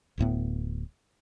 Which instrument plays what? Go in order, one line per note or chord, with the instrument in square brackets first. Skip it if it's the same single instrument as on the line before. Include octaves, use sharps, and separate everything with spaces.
[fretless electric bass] D1 D2 A2 B3